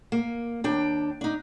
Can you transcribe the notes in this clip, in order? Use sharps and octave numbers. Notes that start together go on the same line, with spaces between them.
A#3
D#2 D4 G5
D4 D#4